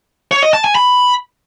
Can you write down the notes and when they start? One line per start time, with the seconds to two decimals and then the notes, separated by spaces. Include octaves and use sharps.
0.32 C#5
0.43 D#5
0.53 A5
0.64 G#5
0.75 B5